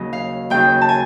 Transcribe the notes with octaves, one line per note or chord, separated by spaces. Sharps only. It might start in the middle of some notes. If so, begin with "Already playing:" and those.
Already playing: D#2 C#3 F#3 D#5
F5
D#2 C#3 F#3 G5
A5
G#5